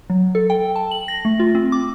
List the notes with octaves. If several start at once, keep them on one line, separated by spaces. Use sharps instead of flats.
F#3
A4
G5
A5
F#7
A#6
A3
F4
C4
D6